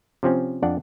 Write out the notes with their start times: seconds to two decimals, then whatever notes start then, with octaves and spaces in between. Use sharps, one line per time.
0.23 C3 F3 C4 C#4
0.63 F2 D4 D5 F#5